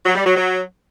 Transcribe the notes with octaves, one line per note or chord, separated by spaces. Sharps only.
F#3
G3
F#3
F#3